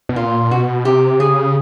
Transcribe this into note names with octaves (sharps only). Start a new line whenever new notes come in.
B2
A#2 F4
B2 F#4
C3 G4
C#3 G#4